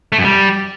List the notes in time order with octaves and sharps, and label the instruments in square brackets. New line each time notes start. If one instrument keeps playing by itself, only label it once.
[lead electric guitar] A3
F#2
G3